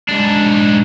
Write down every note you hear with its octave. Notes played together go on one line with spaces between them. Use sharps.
G#2 D4